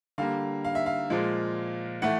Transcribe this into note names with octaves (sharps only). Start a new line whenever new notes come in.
D3 G3 A#3 F5
F5
E5
F5
A#2 F3 G#3
A2 E3 A3 F#5